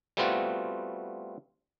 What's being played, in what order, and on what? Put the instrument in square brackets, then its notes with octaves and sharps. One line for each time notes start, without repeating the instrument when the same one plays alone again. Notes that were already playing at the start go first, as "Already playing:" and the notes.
[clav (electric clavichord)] G3 A3 B3 C4 F4 F#4